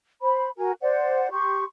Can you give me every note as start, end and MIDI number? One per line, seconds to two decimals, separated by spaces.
0.22 0.48 72
0.22 0.48 83
0.57 0.72 66
0.57 0.72 70
0.57 0.72 80
0.81 1.28 72
0.81 1.28 74
0.81 1.28 78
1.31 1.63 67
1.31 1.63 84
1.31 1.63 85